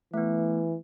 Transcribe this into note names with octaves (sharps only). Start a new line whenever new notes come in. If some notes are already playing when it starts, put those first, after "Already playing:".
E3 A3 B3